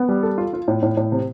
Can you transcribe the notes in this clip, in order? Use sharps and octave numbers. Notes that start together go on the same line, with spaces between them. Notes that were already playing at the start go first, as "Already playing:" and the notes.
Already playing: B3
G3
A4
F4
F4
A2
A2
A2
C3